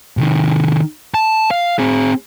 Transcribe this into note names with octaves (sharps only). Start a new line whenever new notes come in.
C3 D#3
A5
F5
C4 G#4